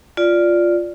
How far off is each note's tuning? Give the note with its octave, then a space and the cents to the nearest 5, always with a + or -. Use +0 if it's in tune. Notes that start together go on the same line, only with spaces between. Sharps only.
F4 +0 D5 +0